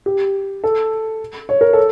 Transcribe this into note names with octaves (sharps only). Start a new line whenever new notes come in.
G4
A4
C#5
A#4
A4